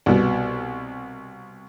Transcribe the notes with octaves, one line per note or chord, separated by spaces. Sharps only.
C2 B2